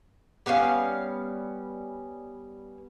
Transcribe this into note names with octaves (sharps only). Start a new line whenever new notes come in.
G3 B3 C#4 F5